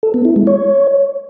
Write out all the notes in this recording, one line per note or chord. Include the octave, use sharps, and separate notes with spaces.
A4
B3
E4
G#3
C#5